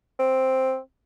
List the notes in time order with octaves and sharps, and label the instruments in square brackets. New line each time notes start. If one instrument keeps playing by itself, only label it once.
[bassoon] C4